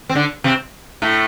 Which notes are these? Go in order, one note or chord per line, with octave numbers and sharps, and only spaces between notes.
C4
D3 D4
C3 C4
A2 A3